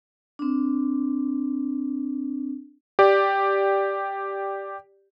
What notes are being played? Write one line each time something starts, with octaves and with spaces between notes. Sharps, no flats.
C4 D4
G4 D5